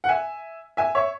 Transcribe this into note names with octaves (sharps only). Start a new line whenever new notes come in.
F#5
E5 G#5
E5 G#5
C#5 E5